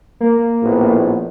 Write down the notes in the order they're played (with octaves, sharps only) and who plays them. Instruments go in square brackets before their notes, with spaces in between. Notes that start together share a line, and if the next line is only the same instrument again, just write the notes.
[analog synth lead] A#3
[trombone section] A#1 A2 B3